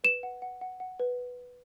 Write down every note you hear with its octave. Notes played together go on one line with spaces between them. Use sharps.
B4 E7
F#5
F#5
F#5
F#5
B4